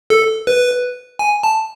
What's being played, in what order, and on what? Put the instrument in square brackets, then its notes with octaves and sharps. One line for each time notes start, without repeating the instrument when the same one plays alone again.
[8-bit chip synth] A4
B4
G#5
A5